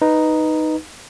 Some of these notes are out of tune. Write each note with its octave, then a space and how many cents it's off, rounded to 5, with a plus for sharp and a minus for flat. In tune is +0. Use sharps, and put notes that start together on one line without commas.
D#4 +0 B4 +0